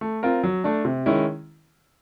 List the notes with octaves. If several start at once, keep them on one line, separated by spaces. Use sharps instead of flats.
A3
C4 F4 A#4
F#3
A3 D4
C3
D#3 G#3 C#4 E4